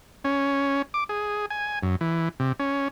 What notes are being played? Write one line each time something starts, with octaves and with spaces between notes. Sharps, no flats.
C#4
D6
G#4
G#5
F#2
E3
C3
C#4